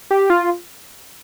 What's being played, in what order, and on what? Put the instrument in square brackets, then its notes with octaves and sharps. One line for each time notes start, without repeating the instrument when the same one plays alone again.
[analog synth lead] G4
F4